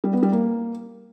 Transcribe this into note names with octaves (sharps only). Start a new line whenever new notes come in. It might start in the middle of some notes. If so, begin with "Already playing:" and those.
G3
B3
G3
A#3